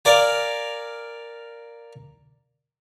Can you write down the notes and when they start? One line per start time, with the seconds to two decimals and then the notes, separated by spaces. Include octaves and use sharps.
0.05 A#4 D5 F5 G#5